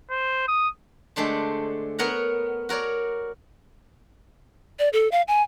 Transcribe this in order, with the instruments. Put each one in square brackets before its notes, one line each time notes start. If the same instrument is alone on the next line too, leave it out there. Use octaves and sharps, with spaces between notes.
[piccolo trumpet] C5
D#6
[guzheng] D3 G#3 A3 D4 C5
B3 A#4 C#5 F#5 A#5
F#4 A#4 C#5 D5
[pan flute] D5
A4
F5
G#5